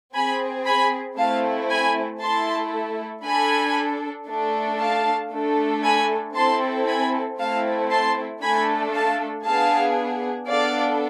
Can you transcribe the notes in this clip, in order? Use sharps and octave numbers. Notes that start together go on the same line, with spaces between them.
C4 G#4 G#5 B5
G#5 B5
A3 C4 E4 F5 A5
G#5 B5
A3 E4 A4 A5 C6
D4 A4 G#5 B5
A3 D4 A4
F5 A5
A3 D4 A4
G#5 B5
C4 E4 A4 A5 C6
G#5 B5
A3 C4 E4 A4 F5 A5
A5 C6
A3 D4 A4 G#5 B5
F5 A5
B3 D4 G#4 F5 A5
B3 D4 A4 D5 F5